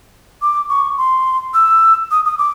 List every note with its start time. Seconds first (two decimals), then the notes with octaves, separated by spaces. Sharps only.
0.42 D6
0.69 C#6
0.98 C6
1.54 E6
2.11 D#6
2.25 D#6
2.38 D6